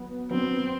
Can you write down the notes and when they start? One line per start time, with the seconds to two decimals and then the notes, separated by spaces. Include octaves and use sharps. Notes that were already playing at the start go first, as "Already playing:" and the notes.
Already playing: F#3 B3
0.31 F#3 B3 C4 D4